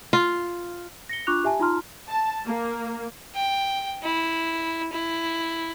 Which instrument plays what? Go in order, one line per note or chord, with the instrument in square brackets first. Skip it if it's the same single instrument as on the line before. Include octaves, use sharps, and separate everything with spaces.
[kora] F4
[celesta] A#6 C#7 G7
D4 F4 C#6 D6 F#6 F7
G4 E5 G#5 A5
D#4 F4 A5 A#5 C6 F6
[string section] A5
A#3
[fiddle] G5
E4
E4